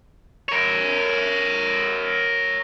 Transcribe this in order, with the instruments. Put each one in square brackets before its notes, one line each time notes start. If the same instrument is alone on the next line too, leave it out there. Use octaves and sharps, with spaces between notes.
[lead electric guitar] A#4 C#5